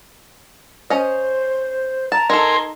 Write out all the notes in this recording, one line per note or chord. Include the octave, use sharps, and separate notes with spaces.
C#4 C5 D#5
A5 A#5
D#4 A4 A#4 G#5 C6